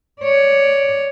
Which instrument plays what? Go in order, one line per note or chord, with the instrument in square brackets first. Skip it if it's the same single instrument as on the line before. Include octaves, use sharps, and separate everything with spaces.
[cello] C#5 D5